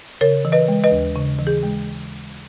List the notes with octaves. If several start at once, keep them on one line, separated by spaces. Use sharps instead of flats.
C#3 A#4 C#5
E3
B4 D#5
G#3
B4 D#5
D#2
C#3
E3
G#4
G#3